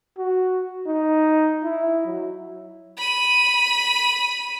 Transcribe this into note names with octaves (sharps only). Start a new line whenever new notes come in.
F#4
D#4
E4
F#3
B5 D#7